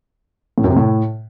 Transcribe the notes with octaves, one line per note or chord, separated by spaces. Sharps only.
A2
F#2
C3
A2